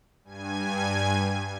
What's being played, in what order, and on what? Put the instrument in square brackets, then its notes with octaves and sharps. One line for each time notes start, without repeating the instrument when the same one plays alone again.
[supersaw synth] G2 G#5 G#6